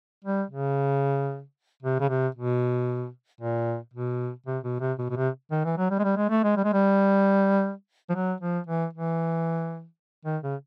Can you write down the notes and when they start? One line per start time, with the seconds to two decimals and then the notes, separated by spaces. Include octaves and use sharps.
0.24 G3
0.50 C#3
1.82 C3
2.00 C#3
2.09 C3
2.35 B2
3.40 A#2
3.94 B2
4.46 C3
4.64 B2
4.80 C3
4.98 B2
5.10 B2
5.16 C3
5.51 D#3
5.65 E3
5.77 F#3
5.91 G3
5.99 G#3
6.04 G3
6.17 G#3
6.30 A3
6.44 G#3
6.56 G3
6.64 G#3
6.73 G3
8.09 F3
8.15 F#3
8.40 F3
8.67 E3
8.93 E3
10.25 D#3
10.43 C#3